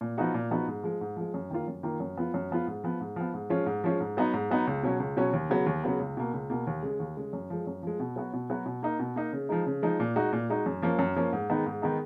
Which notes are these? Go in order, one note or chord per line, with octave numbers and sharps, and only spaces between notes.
A#2
F3 B3 D#4 F#4
A#2
F3 B3 D#4 F#4
G#2
F3 G#3
G#2
F3 G#3
F#2
D#3 A#3 F4
F#2
D#3 A#3 F4
F#2
F3 B3 F4
F#2
F3 B3 F4
G#2
F3 B3
G#2
F3 B3
G#2
F3 G#3 C#4 F4
G#2
F3 G#3 C#4 F4
G#2
F#3 B3 D#4
G#2
F#3 B3 D#4
C#2
B2 F#3 C#4
C#2
B2 F#3 C#4
D#2
C#3 F#3 B3
D#2
C#3 F#3 B3
C#2
B2 A#3
C#2
B2 A#3
D#2
C#3 G#3
D#2
C#3 G#3
F#2
F3 G#3
F#2
F3 G#3
B2
F#3 B3 F#4
B2
F#3 B3 F#4
B2
A#3 D#4
B2
A#3 D#4
C#3
F3 G#3 D#4
C#3
F3 G#3 D#4
A#2
G#3 D#4 F#4
A#2
G#3 D#4 F#4
F#2
F3 A#3 C#4
F#2
F3 A#3 C#4
G#2
D#3 G#3 B3 D#4
G#2
D#3 G#3 B3 D#4